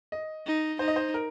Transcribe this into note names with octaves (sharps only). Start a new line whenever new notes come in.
D#5
D#4
D#4 C5
D#5
C5
A#4